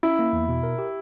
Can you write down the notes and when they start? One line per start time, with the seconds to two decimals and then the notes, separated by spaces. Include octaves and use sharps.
0.03 C#4 E4
0.19 A#3
0.33 E2
0.49 B2
0.63 A#4
0.78 G4